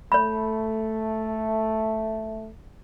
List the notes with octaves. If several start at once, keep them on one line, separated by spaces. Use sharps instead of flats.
A3 C#5 B5